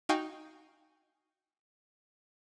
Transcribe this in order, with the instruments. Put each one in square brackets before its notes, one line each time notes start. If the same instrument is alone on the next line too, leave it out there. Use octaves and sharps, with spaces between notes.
[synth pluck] D#4 F#4 F5 G5 G#5 C#6